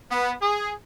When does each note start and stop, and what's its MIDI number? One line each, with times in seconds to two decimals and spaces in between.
0.11 0.33 59
0.42 0.73 68